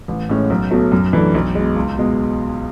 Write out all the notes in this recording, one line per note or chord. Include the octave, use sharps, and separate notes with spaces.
A1
A2 G#3 C#4
B1
B2 F#3 A3
F#2
E3 A3 D4
B1
B2 G#3
C#2
B2 G#3